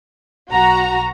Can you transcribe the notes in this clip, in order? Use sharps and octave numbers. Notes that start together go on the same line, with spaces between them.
B1 F#4 A#5